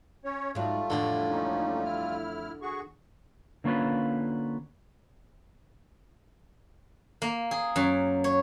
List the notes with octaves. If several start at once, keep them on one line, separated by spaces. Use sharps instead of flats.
C#4 C#5
G#2 F#3 G3 A3 F4
F2 A2 D3 E3
A#3 C#4 D#4
E4 F6
F#4 G#4 C#6
D3 A#3 C#4 F4 B4
A#3
G#4
F#2
C#5